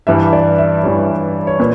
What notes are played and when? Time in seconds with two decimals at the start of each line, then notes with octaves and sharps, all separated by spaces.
0.07 G2 E3 G3 E5
0.33 D5
0.58 E5
0.83 G2 E3 G3 C#5
1.47 C#5
1.60 A#2 B4